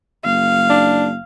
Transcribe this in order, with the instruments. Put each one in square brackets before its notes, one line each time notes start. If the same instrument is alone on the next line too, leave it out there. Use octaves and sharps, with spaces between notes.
[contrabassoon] F#1 [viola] F5
[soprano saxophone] D4